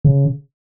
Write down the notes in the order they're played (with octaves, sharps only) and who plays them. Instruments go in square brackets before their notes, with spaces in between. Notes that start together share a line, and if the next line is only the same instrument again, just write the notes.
[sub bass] C#3